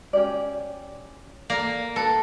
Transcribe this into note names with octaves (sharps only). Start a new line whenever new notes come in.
C#4 G4 D5
A#3 D5
A4 B4 B5